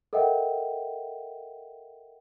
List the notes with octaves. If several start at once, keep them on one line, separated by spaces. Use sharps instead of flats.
A4 A#4 D#5 E5 F#5 G5